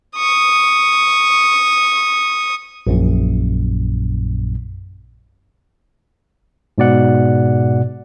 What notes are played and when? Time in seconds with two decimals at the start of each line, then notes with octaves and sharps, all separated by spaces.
0.16 C#6 D#6
2.87 A#1 F#2 A#2
6.78 G#2 B2 D5 F#5